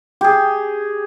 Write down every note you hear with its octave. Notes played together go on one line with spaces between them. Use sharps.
G4 G#4